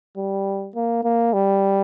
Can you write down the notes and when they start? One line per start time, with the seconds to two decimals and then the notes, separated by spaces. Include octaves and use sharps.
0.17 G3
0.76 A#3
1.04 A#3
1.33 G3